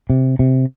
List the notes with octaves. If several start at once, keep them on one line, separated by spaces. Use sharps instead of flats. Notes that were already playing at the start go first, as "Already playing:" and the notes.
C3
C3